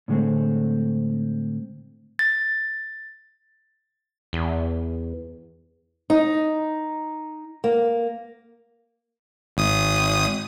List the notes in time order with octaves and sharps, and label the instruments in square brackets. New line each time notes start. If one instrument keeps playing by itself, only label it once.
[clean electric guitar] A2 D3 G#3 A3 C4
[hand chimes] A6
[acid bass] E2
[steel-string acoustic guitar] D#4
A#3
[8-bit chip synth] G#1 D#6